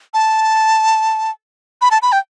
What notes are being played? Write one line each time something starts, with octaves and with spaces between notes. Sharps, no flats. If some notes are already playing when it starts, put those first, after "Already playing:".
A5
B5
A5
B5
G5